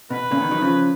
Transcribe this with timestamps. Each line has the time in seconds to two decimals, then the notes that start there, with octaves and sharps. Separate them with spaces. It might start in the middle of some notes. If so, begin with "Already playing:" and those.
0.10 B2 B4
0.31 A#2 C#3
0.41 B2 D#3
0.51 D#3 F#3
0.61 C#3 F3